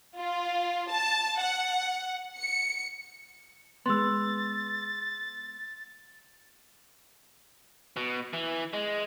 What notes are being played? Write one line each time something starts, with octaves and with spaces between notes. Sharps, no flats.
F4
A5
F#5
C#7
G#3 B3 C6 E6 A6
B2
E3
G#3